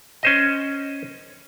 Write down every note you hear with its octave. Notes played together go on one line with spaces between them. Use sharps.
C#4 C5 D#5